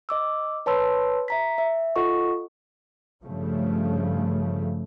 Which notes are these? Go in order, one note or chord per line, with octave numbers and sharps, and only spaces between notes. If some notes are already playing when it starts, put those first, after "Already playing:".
D#5 D6 E6
B4 C#5 A5 B5 C6 E6
E5 A#5 B6
E5
F4 A4 D#5 F#5 C#6
G2 C#3 F3 A3